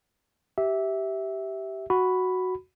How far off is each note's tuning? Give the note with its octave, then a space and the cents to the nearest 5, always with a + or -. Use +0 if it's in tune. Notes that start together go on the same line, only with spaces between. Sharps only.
G4 -15 E5 -10
F#4 +0 B5 +5